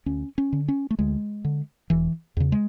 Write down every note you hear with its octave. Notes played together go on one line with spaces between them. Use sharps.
D2 C#4
C#4
D3
C#4
A3
D2 G#3
D3
E1 E3
E2 C#3
G#3